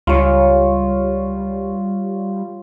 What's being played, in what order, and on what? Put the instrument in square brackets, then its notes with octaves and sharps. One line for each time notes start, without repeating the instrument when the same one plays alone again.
[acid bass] C#2 [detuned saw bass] G3 [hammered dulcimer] F4 C#5